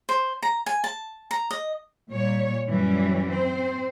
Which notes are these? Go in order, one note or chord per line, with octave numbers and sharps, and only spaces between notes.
C5
A#5
G#5
A5
A#5
D#5
A#2 G3 C#5
F#2 E3 G3 C#4
C4 C5